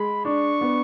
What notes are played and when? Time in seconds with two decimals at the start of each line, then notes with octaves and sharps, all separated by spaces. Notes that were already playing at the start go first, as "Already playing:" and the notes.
Already playing: G#3 B5
0.25 D4 C#6
0.61 B3